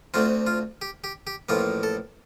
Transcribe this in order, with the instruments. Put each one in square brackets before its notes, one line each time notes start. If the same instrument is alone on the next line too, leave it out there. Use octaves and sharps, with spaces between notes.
[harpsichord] D2 D3 A3 C4 F4
F4
G4
G4
G4
A1 A2 F3 A#3 F4
A4